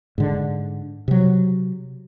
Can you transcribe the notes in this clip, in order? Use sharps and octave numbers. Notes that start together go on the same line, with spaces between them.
G#2 D3
C3 F#3